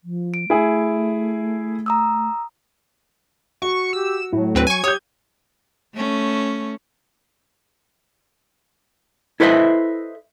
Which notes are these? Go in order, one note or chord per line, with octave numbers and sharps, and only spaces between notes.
F3
D7
A3 E4 G#4
A#5 D#6 E6
F#4 C#6
G4 E6
A2 F#3
D2 C4 B4
G#5 C#6 G#6
G4 C#5 D#6 G6
A3 C#4
E4 A4 B4 C5 D#5 E5